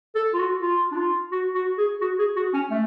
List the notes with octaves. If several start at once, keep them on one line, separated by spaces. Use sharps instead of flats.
A4
F4
F#4
F4
D4
F4
F#4
F#4
G#4
F#4
G#4
F#4
C#4
A3